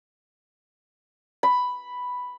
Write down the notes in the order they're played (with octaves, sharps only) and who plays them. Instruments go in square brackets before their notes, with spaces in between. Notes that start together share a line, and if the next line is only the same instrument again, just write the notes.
[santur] B5